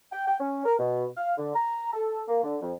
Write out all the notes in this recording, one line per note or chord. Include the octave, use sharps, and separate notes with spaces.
G5
G5
C#4
A#4
B2
F5
D3
A#5
A4
A#3
D3
F2